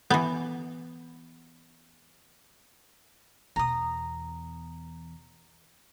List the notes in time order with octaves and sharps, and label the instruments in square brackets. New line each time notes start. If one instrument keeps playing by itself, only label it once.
[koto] E3 B3
[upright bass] E2 B2 [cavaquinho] A#5 D#6